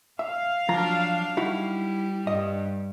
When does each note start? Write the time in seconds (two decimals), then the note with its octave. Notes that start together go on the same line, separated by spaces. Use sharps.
0.19 E5 F5
0.69 F3 F#3 D4 F4 A#5
1.37 G3 D#4 E4 F#4
2.27 G2 D#5